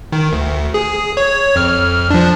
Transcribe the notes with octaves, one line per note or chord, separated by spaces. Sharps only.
D#3
D2
G#4
C#5
F2 F6
F3 D4